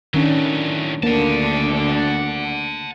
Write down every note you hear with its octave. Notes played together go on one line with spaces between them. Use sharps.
A2 D#3 F#3 C#4 D4
D2 A#3 D4 F#5 A5